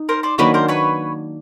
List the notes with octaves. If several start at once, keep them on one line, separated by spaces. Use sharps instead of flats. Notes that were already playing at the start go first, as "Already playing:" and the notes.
Already playing: D#4
A#4 C5
C5 D5
D#3 F#3 A#3 D4 B4 C#5
A#4 C5
B4 C#5